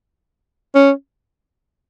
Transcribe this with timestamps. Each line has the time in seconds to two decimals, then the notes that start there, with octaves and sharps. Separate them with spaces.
0.75 C#4